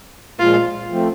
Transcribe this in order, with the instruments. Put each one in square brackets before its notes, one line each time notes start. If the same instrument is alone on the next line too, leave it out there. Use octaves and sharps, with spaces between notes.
[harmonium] A#2 F3 G#3 [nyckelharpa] F4
[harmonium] F3 A3 C4